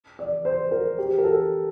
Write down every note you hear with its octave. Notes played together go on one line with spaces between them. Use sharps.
D5
C5
A#4
G4
A#4
A4